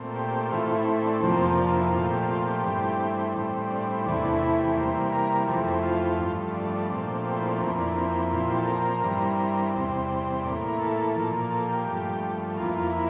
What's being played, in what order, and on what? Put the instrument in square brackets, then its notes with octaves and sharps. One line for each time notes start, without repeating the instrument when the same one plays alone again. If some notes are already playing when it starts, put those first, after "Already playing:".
Already playing: [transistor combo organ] A#2 A3 C4
G4
G4
A2 E3 A3 C4 F4
F4
E4
D4
F2 C3 F3 A#3 C4
D4
E4
A#2 F3 A3 C4 F4
G4
F4
G4
G2 E3 A3 C4
A2 G3 C4
D4
E4
E2 C3 E3 A3 D4
E4
G4
C3 E3 G3 A#3 C5
A#4
F2 E3 A3 C4 G4
F4
G2 F3 A3
D4
D4
A#2 F3 A3 C4 D4
G4
E4
D4
F2 E3 A#3 C4
D4
C4
A#2 F3 C4 E4
G4
A4
A#4
G2 E3 G3 C4
E2 C3 G3 C4
A2 E3 A#3 D5
A#4
A4
A#2 F3 A#3
A4
G4
G2 F3 A3
F2 E3 A#3 F4
F4
E4